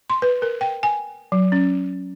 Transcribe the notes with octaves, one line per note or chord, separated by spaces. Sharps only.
C6
B4
A#4
G5
G#5
F#3
C#4